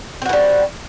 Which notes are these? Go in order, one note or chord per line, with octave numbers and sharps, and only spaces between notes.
E3 G3 C4 F#4